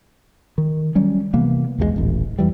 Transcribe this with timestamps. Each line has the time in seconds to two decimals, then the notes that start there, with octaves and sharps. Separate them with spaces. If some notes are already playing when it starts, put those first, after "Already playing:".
0.58 D#3
0.95 F#3 G3 C#4
1.34 C3 E3 A#3 B3
1.78 B1 E2 F3 G#3
1.96 D#1 A1
2.39 F2 E3 G3